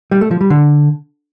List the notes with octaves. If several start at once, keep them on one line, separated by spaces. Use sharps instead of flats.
G3
A3
F3
G3
D3